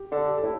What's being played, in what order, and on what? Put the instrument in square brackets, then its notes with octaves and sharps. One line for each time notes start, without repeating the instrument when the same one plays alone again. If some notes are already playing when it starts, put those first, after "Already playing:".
Already playing: [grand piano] G4
[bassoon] D3 [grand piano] A4
[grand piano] G4
[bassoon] A2 [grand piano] A4